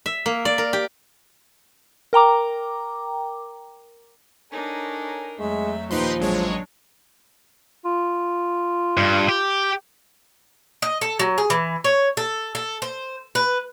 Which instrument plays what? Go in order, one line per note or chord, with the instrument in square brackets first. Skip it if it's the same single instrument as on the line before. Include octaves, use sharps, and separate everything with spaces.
[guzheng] E5
A#3
D5
A#4
G4
[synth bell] A#4 G5 A#5 D6
[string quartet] D4 D#4 A#4 [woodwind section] A4 C#5 G#5
[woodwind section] F2 F#3 A3 [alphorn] G#3 [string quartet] E5
[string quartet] D#2 A#2 G4 [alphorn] F3 [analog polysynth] D#4 B4 C6
[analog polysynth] A1 G#3 C#5 [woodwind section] F#3 [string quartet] D4
[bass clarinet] F4
[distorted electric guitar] G2
G4
[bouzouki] D#5
A4
F#3
G#4
E3
C#5
A4
A4
C5
B4